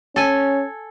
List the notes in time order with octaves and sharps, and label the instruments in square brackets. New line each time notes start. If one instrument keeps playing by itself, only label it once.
[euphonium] C#4 [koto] A4 G#5